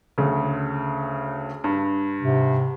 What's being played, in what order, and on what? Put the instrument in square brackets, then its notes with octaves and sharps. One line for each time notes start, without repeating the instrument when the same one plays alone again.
[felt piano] D2 C#3
G2
[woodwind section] G#2 C3